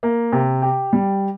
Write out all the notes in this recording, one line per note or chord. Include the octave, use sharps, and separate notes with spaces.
A#3
C3
G4
G3